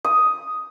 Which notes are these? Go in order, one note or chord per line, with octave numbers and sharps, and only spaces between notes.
D#6